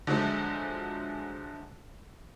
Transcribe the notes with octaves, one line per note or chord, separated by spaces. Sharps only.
D3 F3 F#3 G#3 A3